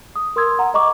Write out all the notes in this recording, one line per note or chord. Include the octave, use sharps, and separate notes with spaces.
D#6
A#4 C6 D#6 E6 G#6
F#5 A#5
D#5 A#5 C#6 D6